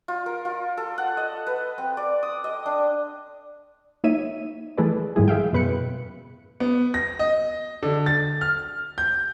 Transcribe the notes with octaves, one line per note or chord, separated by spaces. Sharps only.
F4
A#4
F4
A4
F#5
D#5
B4
C4
D5
D#6
D#5
D4
A#3 D#4 C#5 E5 D#7
E3 A3 G#4 A4 B4 D5
G#2 D#3 F3 G3 E4 G#4
G#4 E5 F5 G5
F#2 B2 B4 F#6 C#7
B3
A#6
D#5
D3
A6
F6
G6